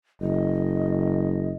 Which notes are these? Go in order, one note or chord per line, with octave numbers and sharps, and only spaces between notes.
F#1 D#5